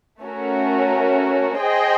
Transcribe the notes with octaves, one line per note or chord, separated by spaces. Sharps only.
A3 C#4 F#4 A#4
G#4 C5 D#5 G5